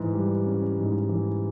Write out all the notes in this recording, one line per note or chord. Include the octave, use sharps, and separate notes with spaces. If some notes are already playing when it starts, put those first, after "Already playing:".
Already playing: G#2 E3
G3
C#4
G#2
E3